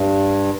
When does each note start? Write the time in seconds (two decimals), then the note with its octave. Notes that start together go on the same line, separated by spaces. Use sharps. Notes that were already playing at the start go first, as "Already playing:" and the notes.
Already playing: G2